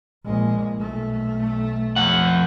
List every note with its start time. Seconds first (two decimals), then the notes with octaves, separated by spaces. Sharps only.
0.25 A#1 G#3
0.76 B1 A3
1.96 F2 F#5